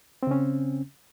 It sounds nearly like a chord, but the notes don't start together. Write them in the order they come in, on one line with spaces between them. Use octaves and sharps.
C4 C#3 C#4